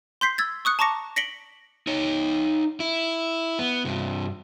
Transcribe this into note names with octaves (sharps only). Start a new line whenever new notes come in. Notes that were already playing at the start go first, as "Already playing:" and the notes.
C6 G6 B6 C7
E6 G#6 A6
C#6 D#6 F#6 C#7
A5 A#5 C#6 D6 A#6 C#7
A#6 B6 C#7 D7 F#7 G7
D#4 C#5
E4
B3
G2 C3